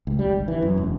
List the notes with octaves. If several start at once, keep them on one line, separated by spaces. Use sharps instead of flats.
C#2
G3
G1
E3
F#2
E1